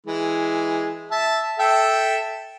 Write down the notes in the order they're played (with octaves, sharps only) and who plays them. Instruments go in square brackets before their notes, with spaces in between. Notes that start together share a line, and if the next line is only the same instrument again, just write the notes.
[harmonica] E3 G#3
E5 A5
A4 E5 G5